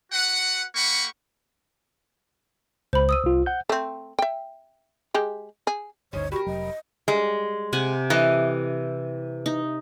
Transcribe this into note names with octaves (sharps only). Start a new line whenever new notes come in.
F#4 B4 F#5
A#3 G4 F#5 B5 C#6
C#2 C5 B5
D#6 E6 D#7
C2 F4
F#5 G6
A3 C4
E5 G5
G#3 G4
G#4
G1 D2 C#4 D#4 C5 C#5
G3 F#4 A#4
F1 F#3 D#5
G3 G#3
C3 F#5 G#5
E3 G4 A4 D#5
D#4